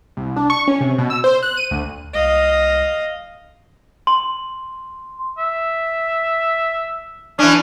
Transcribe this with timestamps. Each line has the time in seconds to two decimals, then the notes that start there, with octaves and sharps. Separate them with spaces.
0.17 C2
0.36 D4
0.50 C#6
0.68 C#4
0.81 C3
0.98 B2
1.10 E6
1.24 C5
1.43 F#6
1.57 D#7
1.71 D2
2.14 C2 D#5 F5
4.07 C6
5.38 E5
7.39 E3 C#4 D4